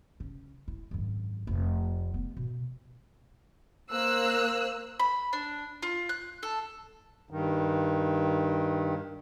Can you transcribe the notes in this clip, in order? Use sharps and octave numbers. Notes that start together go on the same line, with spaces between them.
C#3
E4
G#1 F#2
F1 F4
B3
B2
A#3 C5 E6 F#6
B5
D4
F4
F#6
A4
G2 D#3